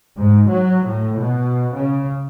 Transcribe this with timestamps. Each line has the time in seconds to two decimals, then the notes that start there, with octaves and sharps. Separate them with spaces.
0.18 G#2
0.49 F#3
0.86 A2
1.19 B2
1.75 C#3